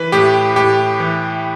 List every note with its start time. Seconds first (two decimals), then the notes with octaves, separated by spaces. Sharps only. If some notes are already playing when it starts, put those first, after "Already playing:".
Already playing: E3 B4
0.12 A2 G4
0.56 A2 G4
1.00 E3